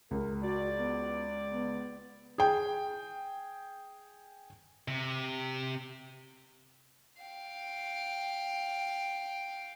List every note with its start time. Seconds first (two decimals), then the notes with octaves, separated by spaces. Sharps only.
0.11 C#2 A#4
0.42 F#4 D5
0.78 B3
1.52 B3
2.38 G#4 G5
4.88 C3
7.22 F5 G5